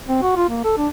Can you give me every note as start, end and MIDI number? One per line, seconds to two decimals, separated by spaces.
0.07 0.22 60
0.22 0.34 66
0.36 0.48 65
0.49 0.64 58
0.64 0.75 69
0.78 0.88 62